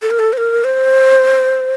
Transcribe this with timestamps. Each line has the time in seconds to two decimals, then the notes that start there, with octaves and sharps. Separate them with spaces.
0.02 A4
0.11 A#4
0.19 A4
0.33 C5
0.37 A#4
0.64 C5